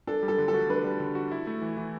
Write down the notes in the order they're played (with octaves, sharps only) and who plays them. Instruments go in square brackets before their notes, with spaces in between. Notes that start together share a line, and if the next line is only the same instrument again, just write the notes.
[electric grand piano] D4 [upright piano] A4
[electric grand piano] G3
[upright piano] A4
[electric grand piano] D3
[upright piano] A4
[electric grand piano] F#4
[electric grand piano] D4 [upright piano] B4
[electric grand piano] G3
D3
F#4
E4
A3
E3
E3